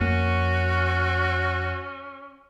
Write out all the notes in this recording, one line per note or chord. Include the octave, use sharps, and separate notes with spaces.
F2 A#3 C#4 F#4